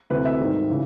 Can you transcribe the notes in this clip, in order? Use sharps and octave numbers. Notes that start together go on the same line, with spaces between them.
D2 C3 E3 B4
E5
G#2 D#3 G3
C#3 E3